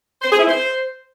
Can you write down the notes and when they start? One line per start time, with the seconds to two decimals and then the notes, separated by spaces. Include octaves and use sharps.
0.22 C5
0.30 G#4
0.39 E4
0.47 C5